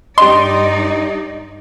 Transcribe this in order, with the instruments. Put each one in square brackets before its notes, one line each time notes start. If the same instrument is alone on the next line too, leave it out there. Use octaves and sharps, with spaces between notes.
[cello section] G2 D#4 D5 [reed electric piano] G4 D#5 [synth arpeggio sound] C6